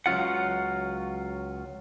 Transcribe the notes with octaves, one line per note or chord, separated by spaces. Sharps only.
C#2 F#3 C#4 F4 F#5